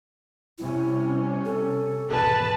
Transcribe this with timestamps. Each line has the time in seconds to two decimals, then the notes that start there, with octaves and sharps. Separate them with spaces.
0.58 C3 G3 C#4 E4
1.45 A4
2.09 G#1 E2 B2 B4 A5